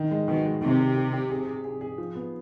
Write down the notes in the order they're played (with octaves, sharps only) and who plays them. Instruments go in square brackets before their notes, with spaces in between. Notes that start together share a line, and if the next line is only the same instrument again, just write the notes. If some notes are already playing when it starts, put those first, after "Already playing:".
Already playing: [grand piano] D#3
G#3
[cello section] B2 [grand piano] D#3
[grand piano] G#3
[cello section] C3 [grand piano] D#3
[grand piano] G4
G4
G4
G#4
G#4
G#4
G#4
F3
B3